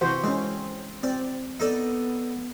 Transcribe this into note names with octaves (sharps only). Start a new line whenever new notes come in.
C3 E3 F#4 C5
G#3 C4 C#4
C4 D5
B3 D#4 A4 D5